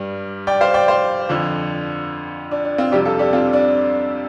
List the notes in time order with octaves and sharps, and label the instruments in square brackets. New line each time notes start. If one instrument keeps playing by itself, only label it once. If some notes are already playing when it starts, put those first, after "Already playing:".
Already playing: [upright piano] G2 G3
D5 G5
C5 F5
D5 G5
C5 F5
F2 D3 F3
D4
D4
C4 F4
F2 C3 G3 D4 G4
F4 A4
D4 G4
C4 F4
D4